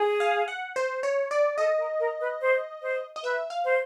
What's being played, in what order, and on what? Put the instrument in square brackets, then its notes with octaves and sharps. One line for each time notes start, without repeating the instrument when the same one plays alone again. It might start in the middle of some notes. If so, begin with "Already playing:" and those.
Already playing: [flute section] G#4
[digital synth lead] F5
F#5
C5
C#5
D5
[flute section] A4 [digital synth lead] D#5
[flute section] A#4
A#4
B4
C5
C5
[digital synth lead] D#5
[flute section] B4 [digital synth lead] E5
[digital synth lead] F5
[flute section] C5